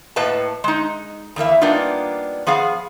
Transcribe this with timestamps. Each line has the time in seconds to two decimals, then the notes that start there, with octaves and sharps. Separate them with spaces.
0.16 A2 A#3 B4 D#5 A5
0.64 G#3 D#4
1.36 E2 E3 A#3 E5
1.61 G3 A#3 B3 D4 D#4 F4
2.47 F3 B3 G#4 F5